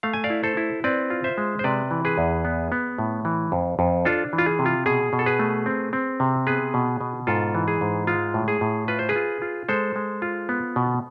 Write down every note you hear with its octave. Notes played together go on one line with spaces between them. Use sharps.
A3 F5
G#5
D5 F5
E4
A4 C5
E4
C4 B4 D5
F4
C5 E5
G#3
C5
C3 B4 D5
E3
G#4 B4
E2
B3
B3
A2
E3
F2
F2
D4 F4 A4
E3
F4
G#4
C3
F4
B2 G#4
B2
A4
G#4 B4
A3
C4
C4
C3
B3 G#4 B4
B2
B2
G#2 F4 A4
E3
G#4
G#2
G#3 F4
A2
G#4
A2
F4 B4
C5
G#4 B4
F4
F4
G#3 A4 C5
G#3
F4
B3
B2